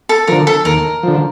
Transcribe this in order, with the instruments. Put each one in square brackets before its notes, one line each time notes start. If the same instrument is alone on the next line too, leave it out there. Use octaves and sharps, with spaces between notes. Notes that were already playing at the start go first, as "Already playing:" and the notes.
[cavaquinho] A4
[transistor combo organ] D3 F3 [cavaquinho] A#4
[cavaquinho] A4
[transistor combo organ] D#2 [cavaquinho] A#4
[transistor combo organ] D3 F3